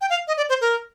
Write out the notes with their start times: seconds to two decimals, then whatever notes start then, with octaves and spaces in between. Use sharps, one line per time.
0.01 G5
0.10 F5
0.28 D#5
0.37 D5
0.49 C5
0.61 A#4